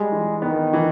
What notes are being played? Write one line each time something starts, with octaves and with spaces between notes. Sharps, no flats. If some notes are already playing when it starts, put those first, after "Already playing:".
Already playing: G3 G#3
E3
D#3 B3
E3